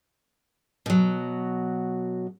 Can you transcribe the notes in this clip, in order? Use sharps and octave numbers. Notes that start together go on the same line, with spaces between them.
B2 F#3